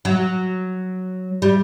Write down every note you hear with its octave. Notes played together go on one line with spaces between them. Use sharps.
F#3
G3